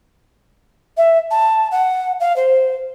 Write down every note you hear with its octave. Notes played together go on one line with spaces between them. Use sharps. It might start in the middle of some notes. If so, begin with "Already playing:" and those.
E5
A5
F#5
F5
C5